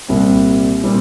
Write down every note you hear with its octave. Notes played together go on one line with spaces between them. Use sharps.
C2 A#2 G3 C4
A#2 G3 C4